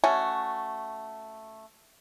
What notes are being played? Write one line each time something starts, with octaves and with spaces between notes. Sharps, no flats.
A3 C#4 F#4 G#5